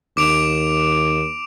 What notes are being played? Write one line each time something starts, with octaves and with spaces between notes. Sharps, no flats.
D#2 D6 D7 F7